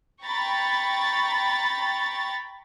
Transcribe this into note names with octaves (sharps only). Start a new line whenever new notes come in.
G5 A#5 B5 C#6 A6